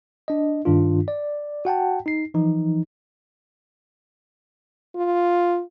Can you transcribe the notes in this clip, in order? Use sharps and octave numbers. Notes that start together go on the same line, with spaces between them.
D4 D#5
G2 D#3 D4 F4
D5
F#4 F#5 G5 A5
D#4 C7
E3 F3 D#4
F4